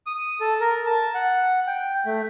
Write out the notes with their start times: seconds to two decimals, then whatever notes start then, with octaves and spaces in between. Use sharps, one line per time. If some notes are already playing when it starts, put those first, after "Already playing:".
0.06 D#6
0.41 A4
0.60 A#4
0.86 A5
1.15 F#5
1.67 G5
2.06 A3